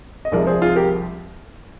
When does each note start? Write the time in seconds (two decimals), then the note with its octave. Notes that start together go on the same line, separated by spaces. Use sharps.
0.25 D#5
0.32 C2 C3 F3 G#3 A#4 D5
0.47 G#4 C5
0.62 F4 G#4
0.76 G4 A#4